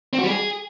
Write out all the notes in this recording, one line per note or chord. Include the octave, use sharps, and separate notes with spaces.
C4
F#4
G3
G#4